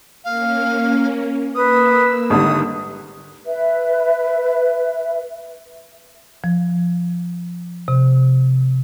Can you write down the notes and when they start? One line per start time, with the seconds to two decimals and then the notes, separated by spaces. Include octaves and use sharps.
0.24 A#3 C#4 F5
1.55 A#3 B4 D#6 E6
2.30 G#1 D3 G3 D#6
3.47 B4 E5
6.44 F3
7.88 C3